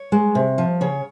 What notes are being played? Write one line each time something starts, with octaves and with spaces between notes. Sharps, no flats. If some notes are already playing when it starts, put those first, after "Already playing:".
Already playing: C#5
G#3
C3
F3
C#3 C#5